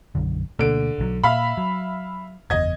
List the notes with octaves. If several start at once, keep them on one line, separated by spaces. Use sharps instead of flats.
B1 F#2 D3
D2 B2 D3 A#3 D7
B1 D#3 F#3
A#2 E5 F5 B5
F#3
F#1 E2 D#5 G#6